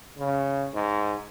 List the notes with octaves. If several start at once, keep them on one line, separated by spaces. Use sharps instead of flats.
C#3
G#2